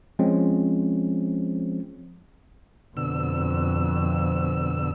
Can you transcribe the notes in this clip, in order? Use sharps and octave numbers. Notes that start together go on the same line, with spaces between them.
F3 G#3 C4 C#4
F2 B2 D3 E6